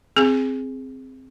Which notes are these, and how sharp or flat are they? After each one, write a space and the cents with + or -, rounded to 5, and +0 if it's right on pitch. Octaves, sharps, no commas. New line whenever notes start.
C4 +0 G#4 +0